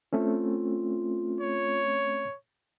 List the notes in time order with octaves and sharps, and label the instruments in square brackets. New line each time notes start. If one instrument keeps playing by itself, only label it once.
[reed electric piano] A3 C4 C#4 [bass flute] F4
[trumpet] C#5